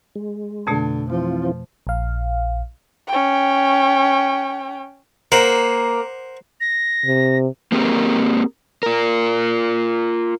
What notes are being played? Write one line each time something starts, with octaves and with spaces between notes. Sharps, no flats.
G#3
F2 B2 D3 A3
E3 F3 C4 F4
A#1 F5
C#4 G5
A#3 A#4 C5 F#5
A#6
C3
A#3 C4 G4 G#4 A#4
F4 A#4